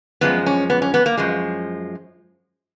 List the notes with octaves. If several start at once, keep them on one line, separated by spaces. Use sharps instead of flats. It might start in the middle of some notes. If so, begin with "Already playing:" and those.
F#2 F3 G#3 B3
C#4
B3
C#4
B3
A#3
F#2 F3 G#3